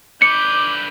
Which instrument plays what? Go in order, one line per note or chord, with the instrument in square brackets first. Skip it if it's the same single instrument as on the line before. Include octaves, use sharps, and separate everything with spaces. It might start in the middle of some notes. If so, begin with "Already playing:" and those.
[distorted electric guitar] D3 B4 [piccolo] D6 [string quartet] G6 [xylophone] C#7